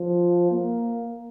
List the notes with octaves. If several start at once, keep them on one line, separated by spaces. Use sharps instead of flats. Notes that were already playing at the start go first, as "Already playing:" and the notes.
Already playing: F3
A#3